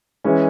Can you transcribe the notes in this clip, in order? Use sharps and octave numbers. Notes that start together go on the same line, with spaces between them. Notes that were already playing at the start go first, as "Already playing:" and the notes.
E3 G#3 C#4